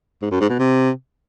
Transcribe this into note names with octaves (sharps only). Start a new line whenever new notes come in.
G#2
F#2
G#2
B2
C3